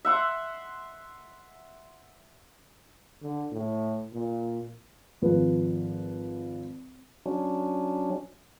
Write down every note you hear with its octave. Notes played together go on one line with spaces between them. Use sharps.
E5 F#5 C6
D3
A2
A#2
G#1 F3 B4
F#3 C#4 D4